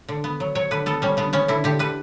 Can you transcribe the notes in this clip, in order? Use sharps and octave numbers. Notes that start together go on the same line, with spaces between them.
D3
B3
F#3
F#3 C#5
D3 B4
B3 A4
G3 C#4
D3 B3
B3 C#4
D3 E4
D3 G4
D3 B4